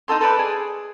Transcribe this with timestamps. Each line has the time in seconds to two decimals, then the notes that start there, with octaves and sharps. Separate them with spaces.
0.08 D#4 F4 A4 C6
0.21 A4 B4 D5 B5
0.39 G#4